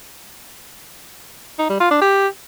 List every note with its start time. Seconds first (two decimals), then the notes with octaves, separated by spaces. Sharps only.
1.59 D#4
1.70 G3
1.80 F4
1.91 D4
2.02 G4